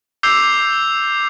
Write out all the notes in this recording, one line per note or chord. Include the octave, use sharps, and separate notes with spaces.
D6 E6 G6 C7 F7